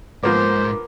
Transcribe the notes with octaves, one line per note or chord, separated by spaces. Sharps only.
G#2 F3 A#3 B3 A#4 C5 D6